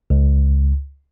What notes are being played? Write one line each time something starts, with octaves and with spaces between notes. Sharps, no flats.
C#2